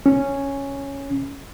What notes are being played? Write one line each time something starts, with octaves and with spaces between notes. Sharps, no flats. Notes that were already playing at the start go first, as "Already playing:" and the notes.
C#4